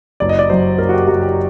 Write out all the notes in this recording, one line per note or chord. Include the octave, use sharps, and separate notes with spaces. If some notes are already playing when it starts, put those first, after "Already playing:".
F#1 D5
D#5
D5
F#2 F#3 C5
F#1 A#4
F#4
G4
F#2 F#3 F#4
G4